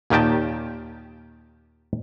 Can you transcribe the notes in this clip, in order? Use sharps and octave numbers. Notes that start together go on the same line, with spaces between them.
D#2 A#2 D#3 G4 G5 A5